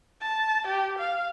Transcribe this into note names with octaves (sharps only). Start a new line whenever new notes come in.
A5
G4
F5